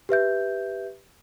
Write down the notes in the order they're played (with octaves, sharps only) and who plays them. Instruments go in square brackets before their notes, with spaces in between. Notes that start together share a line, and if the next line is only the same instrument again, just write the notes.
[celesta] G4 B4 E5 G6